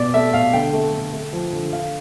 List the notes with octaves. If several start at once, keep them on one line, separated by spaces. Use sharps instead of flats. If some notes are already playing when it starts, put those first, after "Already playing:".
Already playing: B2 D5
A3 E5
B2 F5
D3 G5
A3
D3
A3
F3
D3
D3 F5